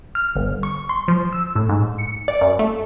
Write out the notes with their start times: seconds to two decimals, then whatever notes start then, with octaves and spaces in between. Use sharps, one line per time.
0.15 F6
0.36 G1
0.63 C#6
0.89 C6
1.08 F3
1.33 E6
1.55 A2
1.69 G#2
1.98 C#7
2.28 D5
2.41 F#2
2.59 A3